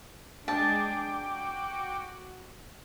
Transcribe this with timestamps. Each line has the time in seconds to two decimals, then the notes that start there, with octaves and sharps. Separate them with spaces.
0.48 G#3 D4 G#4 G5 A5 D6
1.09 F#4